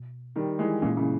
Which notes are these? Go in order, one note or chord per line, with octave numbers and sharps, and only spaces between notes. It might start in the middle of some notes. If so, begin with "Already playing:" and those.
Already playing: B2
D#3 G3
E3 G#3
A#2 E3 G#3 A#3 C#4
C#3 E3